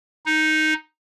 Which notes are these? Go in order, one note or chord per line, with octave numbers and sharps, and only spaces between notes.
D#4